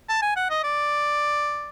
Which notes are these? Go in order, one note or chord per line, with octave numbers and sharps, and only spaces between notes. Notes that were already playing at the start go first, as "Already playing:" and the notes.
A5
G#5
F#5
D#5
D5